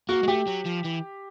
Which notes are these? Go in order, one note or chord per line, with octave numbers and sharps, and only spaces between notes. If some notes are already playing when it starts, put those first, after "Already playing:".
A#3 F#4
G#3
A3 G4
F#3
F3
E3